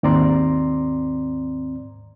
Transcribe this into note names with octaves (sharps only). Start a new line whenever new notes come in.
D#2 G#2 C4 D5 A#5 C6